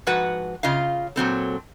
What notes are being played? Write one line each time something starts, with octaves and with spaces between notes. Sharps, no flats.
G#2 F3 F#4 B4 F#5
C#3 F4 D#5 F5
A#2 F#3 C4 A4